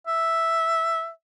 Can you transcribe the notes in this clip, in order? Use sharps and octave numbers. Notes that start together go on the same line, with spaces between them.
E5